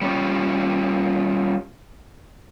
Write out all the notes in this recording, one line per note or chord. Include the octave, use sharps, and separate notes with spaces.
G3 C#4 F4